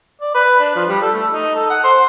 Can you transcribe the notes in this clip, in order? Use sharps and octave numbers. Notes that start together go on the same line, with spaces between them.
D5
B4
D4
F3
G3
A4
A3
D#4
A4
F#5
C5